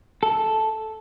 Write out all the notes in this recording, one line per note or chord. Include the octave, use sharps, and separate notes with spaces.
A4